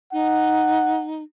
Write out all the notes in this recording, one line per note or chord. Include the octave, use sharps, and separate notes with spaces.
D#4 F#5